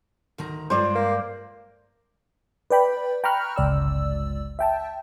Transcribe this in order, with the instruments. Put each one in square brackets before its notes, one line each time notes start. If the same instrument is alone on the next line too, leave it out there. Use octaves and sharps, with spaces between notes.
[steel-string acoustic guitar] D2 D#3 A#5
[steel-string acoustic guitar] G2 G#3 F4 [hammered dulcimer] C5 D5
[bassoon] A#3
[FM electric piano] B4 D5 G5 B5
G5 A#5 B5 C#6 F6 F#6
G1 C#2 D5 E6
E5 G5 A5